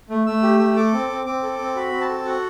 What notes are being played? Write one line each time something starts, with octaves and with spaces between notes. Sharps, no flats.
A3
A3 E6
G4
A3
A4 D6
C4
C4
C4 D6
A4
C4
F#4 B5
C4
A5
A4
F#4 F#5